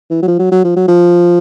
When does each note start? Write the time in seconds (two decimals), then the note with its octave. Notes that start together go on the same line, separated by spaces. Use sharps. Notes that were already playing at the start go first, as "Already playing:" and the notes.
0.10 E3
0.22 F#3
0.28 F3
0.39 F#3
0.52 F#3
0.64 F3
0.76 F#3
0.88 F3